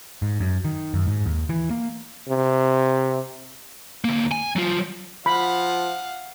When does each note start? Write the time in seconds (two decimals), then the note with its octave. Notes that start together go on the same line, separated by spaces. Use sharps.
0.22 G#2
0.40 F#2
0.65 D#3
0.94 F#2
1.07 G#2
1.26 D#2
1.49 E3
1.71 A#3
2.29 C3
4.05 D2 A#3
4.32 G#5
4.56 F#3 F4
5.26 F3 F5 F#5 B5